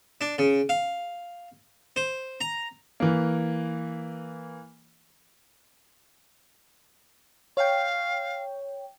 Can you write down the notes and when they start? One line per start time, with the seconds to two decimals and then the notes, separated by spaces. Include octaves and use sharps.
0.21 D4
0.38 C#3
0.69 F5
1.96 C5
2.41 A#5
3.00 E3 A#3
7.57 C#5 F5 G5